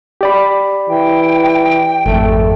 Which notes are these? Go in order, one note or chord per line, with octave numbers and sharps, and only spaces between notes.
G4 D5 B5
E3 G5
G#1 F2 A3